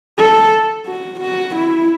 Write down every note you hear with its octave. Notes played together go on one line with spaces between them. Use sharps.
A4
F#4
F#4
E4